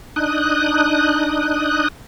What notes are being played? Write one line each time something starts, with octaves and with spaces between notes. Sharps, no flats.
D4 D#4 D#6 F#6